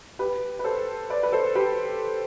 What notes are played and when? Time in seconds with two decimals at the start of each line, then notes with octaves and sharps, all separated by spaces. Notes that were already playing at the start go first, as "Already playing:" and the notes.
0.19 G4 B4
0.59 B4
0.64 A4 C5
1.10 B4 D5
1.23 B4
1.32 A4 C5
1.55 G4 B4